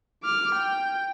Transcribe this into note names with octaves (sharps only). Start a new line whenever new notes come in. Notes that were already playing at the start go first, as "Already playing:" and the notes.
D6 F6
G5